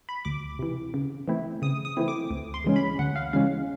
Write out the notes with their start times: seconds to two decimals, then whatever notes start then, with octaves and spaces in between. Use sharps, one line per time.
0.09 B5
0.25 D2 D6
0.59 C3 E3
0.94 C#3
1.28 E3 A3 C4 E4
1.62 C#3 D#6
1.85 D#6
1.97 E3 A3 C4 E4
2.08 D6
2.31 D2
2.54 C6
2.64 C#3 E3 G#3 C#4
2.76 B5
2.99 D2 F#5
3.16 F5
3.33 C#3 E3 G#3 C#4 F5